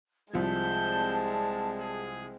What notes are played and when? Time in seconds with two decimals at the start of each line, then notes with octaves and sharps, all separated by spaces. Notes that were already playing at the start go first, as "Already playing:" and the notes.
0.33 C2 F3 G#3 C4 D5 A5 G6
1.80 G#4